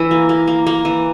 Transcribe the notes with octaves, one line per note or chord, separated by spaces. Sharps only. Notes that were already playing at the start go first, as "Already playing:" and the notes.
Already playing: E3 E4
A#3
A#3
A#3
A#3
E3